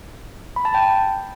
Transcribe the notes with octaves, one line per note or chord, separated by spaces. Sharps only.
B5
A5
G5